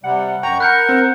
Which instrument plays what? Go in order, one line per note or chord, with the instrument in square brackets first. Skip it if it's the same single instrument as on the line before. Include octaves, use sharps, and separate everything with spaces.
[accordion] C3 G3 [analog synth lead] F#5
[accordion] F#2 A#5 C#6 [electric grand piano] G5
[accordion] A#4 [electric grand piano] B5 [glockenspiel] F#6 G6 C#7
[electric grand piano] C4